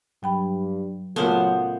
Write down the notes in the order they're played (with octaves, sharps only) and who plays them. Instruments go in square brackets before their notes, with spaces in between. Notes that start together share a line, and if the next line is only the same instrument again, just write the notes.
[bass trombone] G2 [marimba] F#3 G5 B5
[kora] A#2 C#3 A3 [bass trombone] F#3 [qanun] B3 C5 [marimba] D#6